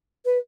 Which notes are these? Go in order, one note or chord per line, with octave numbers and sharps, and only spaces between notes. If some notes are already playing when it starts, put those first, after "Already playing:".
B4